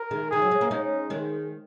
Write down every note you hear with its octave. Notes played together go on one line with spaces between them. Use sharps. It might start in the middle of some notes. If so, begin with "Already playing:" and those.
Already playing: A#4
D#3 G#3
D#3 G#4
F#3
G#3
A#3
G#3 C#4 D#4
D#3 G#3